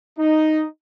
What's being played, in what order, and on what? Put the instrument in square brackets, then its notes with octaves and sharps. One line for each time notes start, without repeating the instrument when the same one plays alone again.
[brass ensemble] D#4